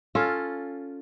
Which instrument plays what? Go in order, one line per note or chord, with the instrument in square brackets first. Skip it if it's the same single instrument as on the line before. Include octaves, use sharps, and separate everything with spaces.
[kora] C#4 F4 A4